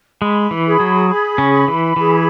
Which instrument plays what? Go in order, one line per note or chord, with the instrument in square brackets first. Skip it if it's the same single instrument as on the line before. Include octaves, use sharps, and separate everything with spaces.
[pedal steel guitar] G#3 [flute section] B5
[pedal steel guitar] E3
[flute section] G#4
[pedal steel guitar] F#3
[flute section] B5
[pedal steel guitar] C#3 C#4
[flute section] B5
[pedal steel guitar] E3
[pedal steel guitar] E3 [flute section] G#4